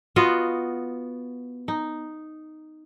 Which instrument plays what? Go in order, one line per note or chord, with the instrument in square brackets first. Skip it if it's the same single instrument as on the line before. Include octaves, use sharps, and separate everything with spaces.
[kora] B3 F4 F#4 D#5
D#4